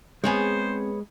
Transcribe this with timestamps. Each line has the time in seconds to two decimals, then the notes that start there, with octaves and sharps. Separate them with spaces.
0.24 G#3 B3 C4 G#4 C5 C#5 G#5